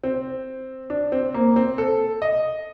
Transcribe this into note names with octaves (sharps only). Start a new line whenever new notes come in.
C4
D4
C4
A#3
C4
A4
D#5